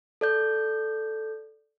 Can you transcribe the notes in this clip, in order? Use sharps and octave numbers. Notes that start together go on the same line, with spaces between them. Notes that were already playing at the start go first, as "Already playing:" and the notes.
A4 D5 G6